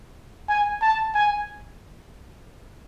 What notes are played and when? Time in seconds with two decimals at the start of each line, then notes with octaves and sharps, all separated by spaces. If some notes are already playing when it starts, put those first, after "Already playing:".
0.49 G#5
0.82 A5
1.15 G#5